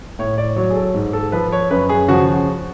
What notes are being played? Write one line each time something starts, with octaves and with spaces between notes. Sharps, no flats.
A2 C#5
D5
F#3 C#5
G#4
A4
G#2
A4
F3 B4
C#5
F#2 B4
G#4
C#3 F3 F#4